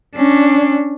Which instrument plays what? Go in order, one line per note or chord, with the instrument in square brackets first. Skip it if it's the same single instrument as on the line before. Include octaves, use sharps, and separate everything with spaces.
[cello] C#4 D4